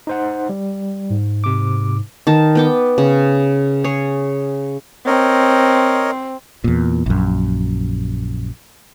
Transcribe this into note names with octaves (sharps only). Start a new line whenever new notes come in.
D#4 C5 F#5
G3
G#2
C3 D6
D#3 A5
B3 G5 D6
C#3
G#4 C#5
C4 A#4 C#5 D#5
E2 A#2
A#1 F#2